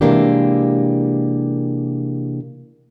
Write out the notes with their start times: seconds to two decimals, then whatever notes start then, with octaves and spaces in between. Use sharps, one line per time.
0.01 C3 E3 G#3 A#3 D4 G4